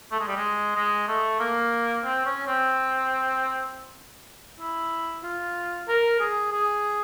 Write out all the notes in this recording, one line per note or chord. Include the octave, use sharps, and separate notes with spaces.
A3
G#3
G3
G#3
G#3
A3
A#3
C4
C#4
C4
E4
F4
A#4
G#4
G#4